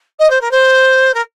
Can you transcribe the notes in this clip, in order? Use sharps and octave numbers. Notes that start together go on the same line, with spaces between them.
D#5
C5
A#4
C5
A#4